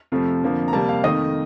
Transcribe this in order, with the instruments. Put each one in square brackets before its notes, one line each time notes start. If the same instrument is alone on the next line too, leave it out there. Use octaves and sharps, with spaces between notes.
[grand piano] F2 C3 F3 A3
F2 D3 F3 A#3
A#5
F2 C3 G3 A#3 A5
F5
F2 D#3 A3 D#5